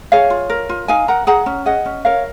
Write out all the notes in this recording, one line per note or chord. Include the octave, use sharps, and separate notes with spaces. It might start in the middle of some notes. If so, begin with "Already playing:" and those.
G#4 C#5 F5
F4
A#4
F4
D#4 F5 G#5
A#4 F#5 A#5
G#4 F#5 A#5
C#4
G#4 D#5 F#5
C#4
A#4 C#5 F5